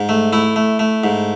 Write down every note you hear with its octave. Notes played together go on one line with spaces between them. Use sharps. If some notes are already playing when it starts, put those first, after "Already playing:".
Already playing: G#2
A3
A3 E4
A3
A3
G#2